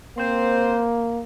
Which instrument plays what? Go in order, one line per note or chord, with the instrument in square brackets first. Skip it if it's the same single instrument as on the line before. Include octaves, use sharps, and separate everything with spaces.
[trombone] A#3 [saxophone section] C4 C5